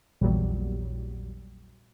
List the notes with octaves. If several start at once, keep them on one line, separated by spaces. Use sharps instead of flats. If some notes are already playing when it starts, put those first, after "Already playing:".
A#1 E2 A#2 F#3 G3